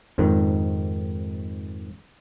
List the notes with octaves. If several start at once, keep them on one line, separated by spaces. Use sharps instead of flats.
F2 G#2 D#3